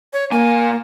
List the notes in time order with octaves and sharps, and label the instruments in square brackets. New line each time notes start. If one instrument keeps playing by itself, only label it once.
[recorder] C#5
[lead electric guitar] A#2 G#5 [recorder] A#3